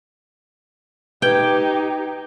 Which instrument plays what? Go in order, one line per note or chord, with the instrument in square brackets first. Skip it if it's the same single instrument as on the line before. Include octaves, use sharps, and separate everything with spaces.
[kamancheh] D#4 G4 [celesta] B4 G#6 [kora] G5